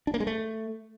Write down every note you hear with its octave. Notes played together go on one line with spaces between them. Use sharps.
D4
A#3
G#3
A3